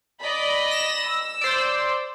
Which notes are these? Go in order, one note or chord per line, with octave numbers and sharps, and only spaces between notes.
D5 D#5 B5
A#6 E7
E6
C5 D5